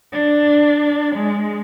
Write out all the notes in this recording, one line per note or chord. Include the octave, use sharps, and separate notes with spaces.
D4
G#3